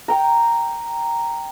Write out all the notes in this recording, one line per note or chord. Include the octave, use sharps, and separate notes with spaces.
G5 A#5